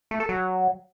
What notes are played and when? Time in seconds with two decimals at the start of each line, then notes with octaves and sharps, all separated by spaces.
0.11 A3
0.20 A4
0.29 F#3